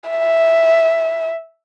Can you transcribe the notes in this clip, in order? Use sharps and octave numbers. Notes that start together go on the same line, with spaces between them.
E5